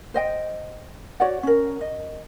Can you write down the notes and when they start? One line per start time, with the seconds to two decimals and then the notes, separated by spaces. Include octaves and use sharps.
0.14 C5 D#5 G5
1.20 F#4 C#5 D5 F#5
1.43 C#4 A#4
1.81 D#5